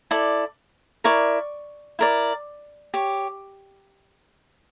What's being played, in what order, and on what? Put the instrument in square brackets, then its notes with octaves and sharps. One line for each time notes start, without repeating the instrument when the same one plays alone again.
[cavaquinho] E4 A4 D5
E4 A#4 D5 C#6
E4 A#4 D5
G4 C#5